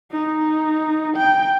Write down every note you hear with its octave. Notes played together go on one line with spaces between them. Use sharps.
D#4
G5